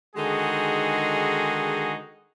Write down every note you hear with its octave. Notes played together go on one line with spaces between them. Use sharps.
D3 D#3 G#3 D#4 F#4 G#4